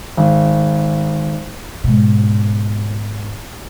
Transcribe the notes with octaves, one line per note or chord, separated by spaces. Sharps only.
G#1
G#2 B2